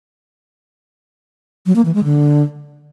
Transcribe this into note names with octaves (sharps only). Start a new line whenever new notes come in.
F#3
A#3
E3
G#3
D3